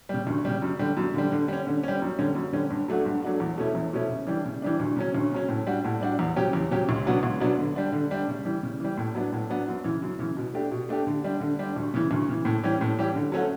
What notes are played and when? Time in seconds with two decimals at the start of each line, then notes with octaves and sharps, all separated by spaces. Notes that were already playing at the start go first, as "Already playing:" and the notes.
0.09 C#3 G3
0.27 D2
0.45 C#3 G3
0.62 F#2
0.79 D3 G3
0.97 F#2
1.14 D3 G3
1.32 D3
1.48 G3 C#4
1.67 D3
1.84 G3 C#4
2.02 F#2
2.18 D3 G3 C#4
2.35 F#2
2.53 D3 G3 C#4
2.70 G2
2.88 F#3 A3 D4 F#4
3.05 G2
3.22 F#3 A3 D4 F#4
3.40 E2
3.57 B2 A3 C#4 E4
3.75 E2
3.93 B2 A3 C#4 E4
4.09 C#3
4.27 E3 G3 D4
4.45 C#3
4.62 E3 G3 D4
4.80 D2
4.96 C#3 F#3 C#4
5.15 D2
5.32 C#3 F#3 C#4
5.49 A2
5.67 G3 D4 F#4
5.84 A2
6.01 G3 D4 F#4
6.19 E2
6.36 C#3 F#3 C#4 G4
6.53 E2
6.71 C#3 F#3 C#4 G4
6.89 C#2
7.05 B2 F#3 B3 D4
7.23 C#2
7.40 B2 F#3 B3 D4
7.59 D3
7.76 G3 D4
7.92 D3
8.11 G3 D4
8.28 C#3
8.45 E3 G3
8.63 C#3
8.80 E3 G3
8.97 A2
9.14 F#3 B3 D4
9.33 A2
9.50 F#3 B3 D4
9.68 F#2
9.84 C#3 E3
10.02 F#2
10.19 C#3 E3
10.37 B2
10.54 A3 D4 G4
10.71 B2
10.89 A3 D4 G4
11.07 D3
11.24 G3 D4
11.41 D3
11.59 G3 D4
11.76 D2
11.94 C#3 E3
12.11 D2
12.29 C#3 E3
12.45 A2
12.63 E3 G3 C#4 G4
12.81 A2
12.98 E3 G3 C#4 G4
13.16 D3
13.32 F#3 A3 C#4 F#4